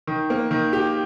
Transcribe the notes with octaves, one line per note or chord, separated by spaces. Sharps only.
D#3
A#3
D#3
G4